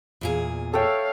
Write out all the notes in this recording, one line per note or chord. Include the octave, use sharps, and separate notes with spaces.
E2 A#2 G#4
A4 C#5 E5 F5 G5